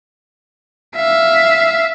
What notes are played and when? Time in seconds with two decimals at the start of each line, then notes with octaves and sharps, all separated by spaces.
0.96 E5 F5